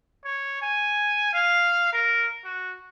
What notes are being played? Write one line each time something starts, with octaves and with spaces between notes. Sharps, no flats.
C#5
G#5
F5
A#4
F#4